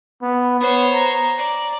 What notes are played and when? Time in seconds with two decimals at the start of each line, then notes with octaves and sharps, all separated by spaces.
0.22 B3
0.60 B3 C5 C#5
0.94 A#5
1.38 D5